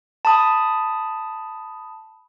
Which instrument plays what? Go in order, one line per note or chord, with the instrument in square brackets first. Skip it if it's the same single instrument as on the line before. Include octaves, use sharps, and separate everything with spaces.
[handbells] A5 B5 D#6